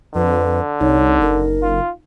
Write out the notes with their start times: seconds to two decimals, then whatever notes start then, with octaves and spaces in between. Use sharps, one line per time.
0.15 F2 D3 B4
0.81 C2 D#4 C#5
1.20 F#1 A#4
1.62 F4